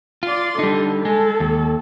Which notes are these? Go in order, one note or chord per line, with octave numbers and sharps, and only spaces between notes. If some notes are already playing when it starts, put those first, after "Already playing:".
F4 D5 C6
D3 G3 D#4
G#3 A4
D#2